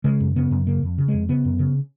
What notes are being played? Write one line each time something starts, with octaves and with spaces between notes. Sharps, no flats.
C#3 G#3
F#2
C#3 B3
F#2
C#3 A#3
F2
C#3
G#3
F2
C#3 B3
F#2
C#3